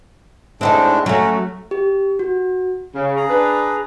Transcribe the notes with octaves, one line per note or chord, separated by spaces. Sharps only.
A2 G#3 C4 D4 D#4 A4
F#3 A3 C#4 F#4
G4
F#4
C#3
G#4 A#5
D4 B4